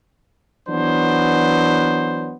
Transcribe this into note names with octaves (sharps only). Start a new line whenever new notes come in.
E3 F#3 B3 D4 C5